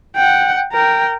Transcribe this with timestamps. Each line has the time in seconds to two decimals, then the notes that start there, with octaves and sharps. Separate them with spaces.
0.16 F#5 G5
0.72 A#4 G5